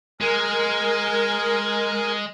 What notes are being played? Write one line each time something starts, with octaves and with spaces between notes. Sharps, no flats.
G#3 A#4 G#5